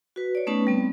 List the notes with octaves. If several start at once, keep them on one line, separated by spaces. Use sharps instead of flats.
F#4 B4
C#5 D5
A3 B3 C#4 D#4 B4 A5
G3 B3 C4